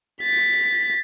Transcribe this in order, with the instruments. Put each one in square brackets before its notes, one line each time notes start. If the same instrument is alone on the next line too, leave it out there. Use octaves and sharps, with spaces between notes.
[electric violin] A6 B6